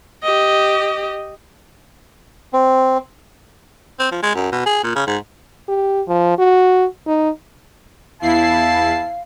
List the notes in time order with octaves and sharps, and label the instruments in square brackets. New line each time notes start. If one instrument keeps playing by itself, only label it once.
[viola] G4 D#5
[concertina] C4
[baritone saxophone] C4
F3
G#3
F#2
B2
G#4
A#2
C#3
G#2
[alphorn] G4
F3
F#4
D#4
[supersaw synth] E2 E4 C7 [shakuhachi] F5 [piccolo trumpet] A5